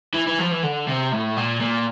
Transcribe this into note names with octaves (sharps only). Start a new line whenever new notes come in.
E3
E3
F3
E3
D3
C3
A2
A#2
A#2